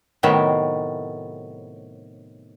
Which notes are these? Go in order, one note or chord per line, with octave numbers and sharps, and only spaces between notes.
A2 C3 D#3 F#3 B3